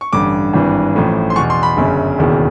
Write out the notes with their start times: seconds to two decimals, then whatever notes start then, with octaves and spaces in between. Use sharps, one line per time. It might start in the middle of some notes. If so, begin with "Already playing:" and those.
0.01 C#6
0.13 A1 G2 D3 D6
0.54 G#1 G2 E3
0.95 A1 A2 F3
1.30 C6
1.36 E2 C#6
1.39 B2
1.50 C6
1.63 B5
1.77 G1 F#2 C#3
2.18 E1 D#2 C#3 E3